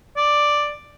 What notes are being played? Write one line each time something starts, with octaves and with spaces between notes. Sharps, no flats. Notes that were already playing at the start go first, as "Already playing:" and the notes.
D5